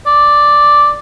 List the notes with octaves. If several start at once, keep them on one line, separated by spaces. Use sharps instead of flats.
D5